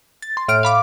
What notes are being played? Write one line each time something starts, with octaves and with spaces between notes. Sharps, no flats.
A6
C6
A2 F6 D7
F5 B5 D6